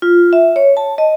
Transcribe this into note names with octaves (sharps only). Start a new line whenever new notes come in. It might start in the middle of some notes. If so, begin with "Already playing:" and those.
F4
E5
C#5
A5
D#5